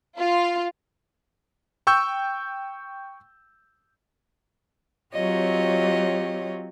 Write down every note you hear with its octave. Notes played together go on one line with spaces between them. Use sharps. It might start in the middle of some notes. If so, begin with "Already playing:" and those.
F4
G5 C#6 E6 G6
F#3 C4 F4 G4 C#5 D#5